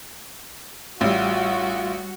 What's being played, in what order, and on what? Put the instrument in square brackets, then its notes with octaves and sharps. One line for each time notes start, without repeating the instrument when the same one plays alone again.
[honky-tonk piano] A1 [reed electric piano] G3 E6 [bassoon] F4 [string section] F#4